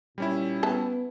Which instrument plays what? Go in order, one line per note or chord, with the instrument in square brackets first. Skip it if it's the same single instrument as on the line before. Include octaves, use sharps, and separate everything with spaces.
[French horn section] A#2 [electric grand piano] G3 C#4 E4
[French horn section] B3 [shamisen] B4 E5 A5